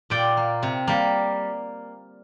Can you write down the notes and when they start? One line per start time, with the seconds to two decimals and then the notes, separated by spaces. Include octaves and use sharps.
0.10 A#2 D5 G5
0.37 A#3
0.63 C3
0.87 G3 A#3